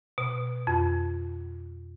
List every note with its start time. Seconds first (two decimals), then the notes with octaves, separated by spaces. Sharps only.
0.18 B2
0.67 F2